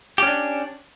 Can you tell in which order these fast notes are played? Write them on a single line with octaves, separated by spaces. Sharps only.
G4 C#4 D4